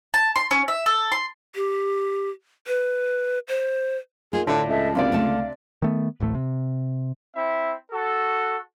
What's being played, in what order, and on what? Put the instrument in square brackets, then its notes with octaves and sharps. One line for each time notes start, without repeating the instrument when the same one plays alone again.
[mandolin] A5
C6
C#4
E5
A4
C6
[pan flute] G4
B4
C5
[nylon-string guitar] A#3 D#4 F4 [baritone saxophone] G#4
[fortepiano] A2 D4 [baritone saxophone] D3 [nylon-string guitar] F4
[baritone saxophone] C#2 [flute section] A4 D#5 E5
[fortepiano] C3 D4 D5 [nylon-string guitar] A#3 B3 F#4 [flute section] F5
[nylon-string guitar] D3 A3 A5
[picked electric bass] D#3 A3 B3
D1 A1 A2 A3
C3
[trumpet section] C4 E4 E5
F#4 A4